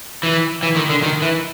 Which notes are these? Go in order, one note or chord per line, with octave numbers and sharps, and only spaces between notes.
E3
E3
D#3
D3
D#3
E3